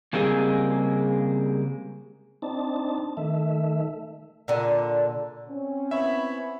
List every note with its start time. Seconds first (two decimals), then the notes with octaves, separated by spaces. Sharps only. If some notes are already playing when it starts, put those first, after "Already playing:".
0.13 C#3 G3 G#3 A#3 C4 G#4
2.42 C4 D4 D#4 A5
3.17 D#3 A3 E5
4.48 A#2 D3
5.48 C4 C#4
5.91 B3 E4 C#5 E5